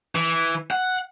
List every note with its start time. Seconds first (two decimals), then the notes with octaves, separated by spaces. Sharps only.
0.15 E3
0.71 F#5